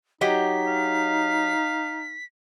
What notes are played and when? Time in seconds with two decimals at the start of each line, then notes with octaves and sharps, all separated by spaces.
0.21 F#3 D#4 G4 D#5 B6
0.67 F5